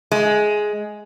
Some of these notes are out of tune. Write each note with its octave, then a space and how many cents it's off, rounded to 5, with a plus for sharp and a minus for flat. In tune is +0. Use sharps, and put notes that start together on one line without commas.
G#3 +10